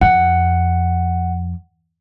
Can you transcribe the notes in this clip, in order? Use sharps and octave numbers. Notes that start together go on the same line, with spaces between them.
F2 F#5